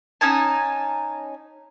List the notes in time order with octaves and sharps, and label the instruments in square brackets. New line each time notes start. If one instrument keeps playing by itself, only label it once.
[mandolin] C#4 D#4 G#5 A5